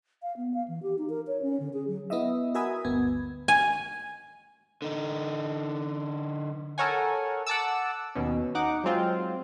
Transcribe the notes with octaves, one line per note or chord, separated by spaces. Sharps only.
F5
B3
F5
E3
G4
D#4
A#4
C#5
C#4
D3
G#4
F#3
B3 E4 D#5 E5
F#4 A#4 E5 G#5 B5 D#6
G1 D2 B3 G#6
G#5
D3 D#4
A4 A#4 C#5 F#5 G#5
F#5 A5 D6 E6
D#2 B2 C#4
D#4 F#5 D6
F#3 G#3 C4 F4